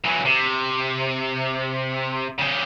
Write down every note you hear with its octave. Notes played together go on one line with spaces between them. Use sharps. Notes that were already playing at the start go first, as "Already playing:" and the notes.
E3 F#3
C3
C#3 G4